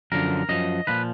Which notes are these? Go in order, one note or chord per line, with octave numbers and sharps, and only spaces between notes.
F#2 D3 F3 A#4
F#2 F3 D#5
A#2 F3 B4